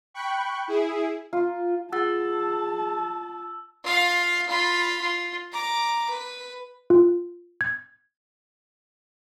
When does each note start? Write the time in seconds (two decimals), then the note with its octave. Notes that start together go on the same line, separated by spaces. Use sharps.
0.14 G5 B5 C#6 F#6
0.68 E4 G#4
1.33 F4
1.92 F4 G#4 F#5 A5 E6 A6
3.84 F4 F5
4.48 F4 B5
5.01 F4
5.52 A#5 D6
6.09 B4
6.90 F4
7.61 G#6